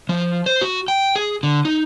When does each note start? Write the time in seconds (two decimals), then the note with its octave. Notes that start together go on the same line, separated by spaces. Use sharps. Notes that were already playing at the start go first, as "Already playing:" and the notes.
0.09 F3
0.46 C5
0.61 F#4
0.88 G5
1.16 G#4
1.43 D3
1.65 D#4